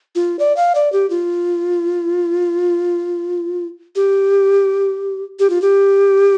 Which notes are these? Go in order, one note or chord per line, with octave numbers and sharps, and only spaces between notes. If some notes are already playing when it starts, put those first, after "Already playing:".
F4
D5
F5
D5
G4
F4
G4
G4
F4
G4